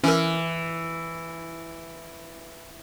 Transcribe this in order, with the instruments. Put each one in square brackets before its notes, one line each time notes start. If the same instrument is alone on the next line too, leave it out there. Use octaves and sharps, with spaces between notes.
[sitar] E3 [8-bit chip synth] C#4 A#4